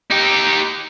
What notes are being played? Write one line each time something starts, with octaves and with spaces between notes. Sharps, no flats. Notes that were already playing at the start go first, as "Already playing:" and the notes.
D#4 G4